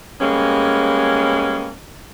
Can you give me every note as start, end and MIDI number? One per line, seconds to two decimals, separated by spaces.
0.21 1.72 55
0.21 1.72 56
0.21 1.72 58
0.21 1.72 59
0.21 1.72 61